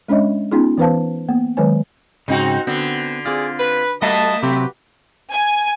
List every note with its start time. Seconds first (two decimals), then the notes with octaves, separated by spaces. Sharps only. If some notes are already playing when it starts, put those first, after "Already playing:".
0.08 G#3 C#4 D4 C#5 D#5 E5
0.51 B3 C#4 D#4 F4 G#4
0.78 E3 B3 B4 C5 F5 A5
1.28 A#3 B3
1.57 D#3 F#3 G#3 B4 C#5 G#5
2.28 G#2 C#3 C4 D#4 F#4
2.67 D3 B3 C4
3.25 C4 F4 G#4 D5
3.59 B4
4.02 G3 A3 F#4 D#5 E5 A5
4.43 C3 F#3 C4 F#4 G4 B4
5.32 G#5